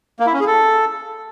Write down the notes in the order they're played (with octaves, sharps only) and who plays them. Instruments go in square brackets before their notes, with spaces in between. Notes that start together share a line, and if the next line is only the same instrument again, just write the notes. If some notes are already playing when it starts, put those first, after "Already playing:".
[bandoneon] A#3
E4
C#4
G#4
A4